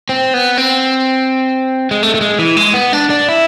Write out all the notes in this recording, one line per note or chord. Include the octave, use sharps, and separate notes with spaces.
C4
B3
C4
G#3
A3
A3
G#3
E3
G#3
B3
D4
D4
E4